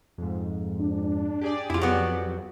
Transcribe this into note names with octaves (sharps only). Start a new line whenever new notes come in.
F2 G#2
D4
G4 G#4 D5
F2 E4 F4
F#3 B3